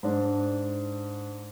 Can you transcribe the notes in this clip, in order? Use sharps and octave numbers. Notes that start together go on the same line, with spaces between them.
G#2 D4